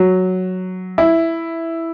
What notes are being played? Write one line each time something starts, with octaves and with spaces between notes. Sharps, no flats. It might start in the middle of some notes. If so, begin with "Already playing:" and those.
Already playing: F#3
E4